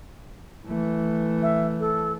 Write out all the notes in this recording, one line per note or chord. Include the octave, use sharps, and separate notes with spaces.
E3 A3
E5
A4